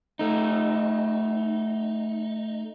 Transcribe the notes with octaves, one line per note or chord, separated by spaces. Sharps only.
A3 D#4